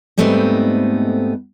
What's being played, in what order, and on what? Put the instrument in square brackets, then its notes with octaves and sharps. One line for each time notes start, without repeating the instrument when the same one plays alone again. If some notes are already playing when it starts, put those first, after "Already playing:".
[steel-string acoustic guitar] G#2 G3 A3 B3 C4 D#4